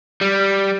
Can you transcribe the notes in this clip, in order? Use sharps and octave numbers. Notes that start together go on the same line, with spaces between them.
G3